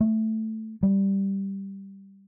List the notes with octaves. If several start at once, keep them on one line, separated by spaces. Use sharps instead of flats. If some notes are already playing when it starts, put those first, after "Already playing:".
A3
G3